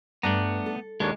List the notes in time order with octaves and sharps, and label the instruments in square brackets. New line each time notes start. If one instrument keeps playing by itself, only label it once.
[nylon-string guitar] G2 [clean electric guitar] A3 B3 [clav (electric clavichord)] D4 A#5
[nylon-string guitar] A4
[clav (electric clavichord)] D#2 D4 C#5 [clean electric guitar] G#3